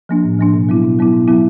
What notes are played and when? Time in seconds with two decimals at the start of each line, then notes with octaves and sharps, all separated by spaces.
0.09 F3 A#3 D4
0.24 A2
0.39 F3 A#3 D4
0.54 B2
0.69 F#3 B3 E4
0.84 B2
0.99 F#3 B3 E4
1.13 B2
1.28 F#3 B3 E4